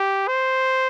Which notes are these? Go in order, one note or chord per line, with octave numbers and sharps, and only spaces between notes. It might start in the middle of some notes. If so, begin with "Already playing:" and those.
Already playing: G4
C5